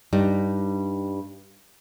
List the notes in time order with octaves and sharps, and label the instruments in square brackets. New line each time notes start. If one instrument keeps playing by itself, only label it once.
[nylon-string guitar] G2 G3 D#4